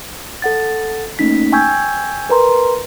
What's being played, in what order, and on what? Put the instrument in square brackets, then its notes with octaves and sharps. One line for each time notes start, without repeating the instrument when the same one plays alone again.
[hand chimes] A4 F#5 A6
A3 A#3 C#4 D#4 B6
G5 G#5 C#6 E6 G6 G#6
A#4 B4 A#5 C6